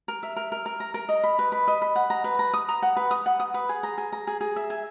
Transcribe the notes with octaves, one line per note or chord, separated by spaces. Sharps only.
A#4
E5
A#4
A#4
A#4
A#5
A#4
D#5
B5
B4
B5
D#5
B5
F#5
A#5
B4
A#5
D#6
A#5
F#5
B4
D#6
F#5
D#6
B4
G#4
A#5
G#4
A#5
G#4
G#4
E5
G#5